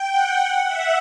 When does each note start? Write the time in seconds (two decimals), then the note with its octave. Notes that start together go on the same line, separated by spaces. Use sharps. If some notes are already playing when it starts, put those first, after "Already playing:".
Already playing: G5
0.11 F#5
0.68 E5